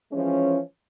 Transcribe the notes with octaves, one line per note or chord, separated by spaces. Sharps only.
E3 F3 G#3 C#4